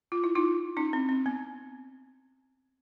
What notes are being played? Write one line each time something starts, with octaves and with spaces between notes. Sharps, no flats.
F4
E4
D#4 F4
C#4 D#4
C4 D4
C4
B3